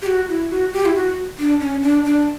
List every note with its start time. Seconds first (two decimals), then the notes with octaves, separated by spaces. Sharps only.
0.02 G4
0.06 F#4
0.29 E4
0.50 F#4
0.73 G4
0.85 E4
0.95 F#4
1.39 D4
1.60 C#4
1.82 D4
2.05 D4